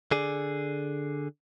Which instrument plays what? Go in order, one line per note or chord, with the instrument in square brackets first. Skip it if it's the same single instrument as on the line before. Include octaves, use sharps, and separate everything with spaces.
[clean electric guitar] D3 G#4 D5